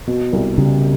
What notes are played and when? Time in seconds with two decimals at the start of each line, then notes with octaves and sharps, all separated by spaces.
0.07 B2
0.33 C2
0.58 C#3 G3